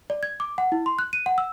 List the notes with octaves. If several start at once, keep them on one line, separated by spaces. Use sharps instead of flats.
D5
G#6
D6
F#5
E4
C6
F#6
D#7
F#5
E6